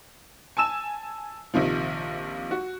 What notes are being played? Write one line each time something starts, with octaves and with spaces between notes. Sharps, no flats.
G#5 A5 E6 E7
A#1 C3 D#3 F3
F#4